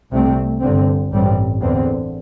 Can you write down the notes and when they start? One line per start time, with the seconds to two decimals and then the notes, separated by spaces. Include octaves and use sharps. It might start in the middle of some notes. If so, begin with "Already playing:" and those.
0.11 C2 C3 A3 C4
0.62 G1 G2 D3 C4
1.11 A1 G2 G3 C4
1.62 E2 D3 C4